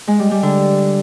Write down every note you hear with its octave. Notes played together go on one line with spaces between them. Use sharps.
G#3
G3
G3
D3